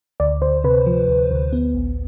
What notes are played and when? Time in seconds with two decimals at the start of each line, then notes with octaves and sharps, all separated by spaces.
0.20 D2 D5
0.42 D2 C5
0.64 C3 B4
0.86 F3
1.08 D2
1.31 D2
1.53 B3
1.75 A1